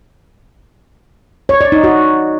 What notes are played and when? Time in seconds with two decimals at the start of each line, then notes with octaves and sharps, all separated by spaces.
1.49 C#5
1.61 D5
1.72 D#4
1.84 F#4